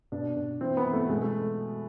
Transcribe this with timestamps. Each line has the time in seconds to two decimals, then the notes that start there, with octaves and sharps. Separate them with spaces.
0.12 B2 D4
0.37 B2
0.61 E3 C4
0.77 B3
0.85 E3
0.93 A3
1.09 B2 G#3
1.22 A3